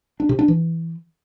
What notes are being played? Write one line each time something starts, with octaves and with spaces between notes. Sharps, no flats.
D4
C3
D4
E3